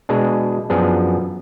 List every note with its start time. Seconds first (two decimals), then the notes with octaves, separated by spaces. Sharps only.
0.09 B2 G#3 D4 G#4
0.70 F#2 F3 B3 D4 G#4